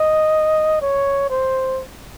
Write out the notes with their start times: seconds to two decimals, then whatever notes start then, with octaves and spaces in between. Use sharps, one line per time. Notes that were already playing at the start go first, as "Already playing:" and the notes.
Already playing: D#5
0.82 C#5
1.30 C5